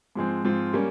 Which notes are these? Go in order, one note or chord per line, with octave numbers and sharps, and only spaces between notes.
G#2 F3 G#3 C4
G#2 F3 C4 F4
G3 A#3 C#4